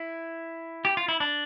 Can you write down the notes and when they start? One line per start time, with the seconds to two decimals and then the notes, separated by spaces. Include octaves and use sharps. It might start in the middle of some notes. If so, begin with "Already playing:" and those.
Already playing: E4
0.85 G4
0.97 F4
1.08 E4
1.20 D4